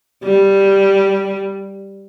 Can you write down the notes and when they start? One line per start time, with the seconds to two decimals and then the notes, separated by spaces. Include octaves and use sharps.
0.24 G3